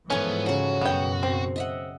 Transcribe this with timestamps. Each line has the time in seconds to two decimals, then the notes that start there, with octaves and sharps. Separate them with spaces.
0.10 G#2 E3 F3 A3 B3 C#4 G#5
0.46 C#3 F#3 F#4
0.81 F#2 B2 B3 G5
1.23 C4
1.56 D#5 E5 F#5